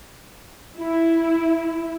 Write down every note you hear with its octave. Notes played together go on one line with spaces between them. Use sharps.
E4